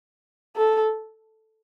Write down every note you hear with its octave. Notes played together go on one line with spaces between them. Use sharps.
A4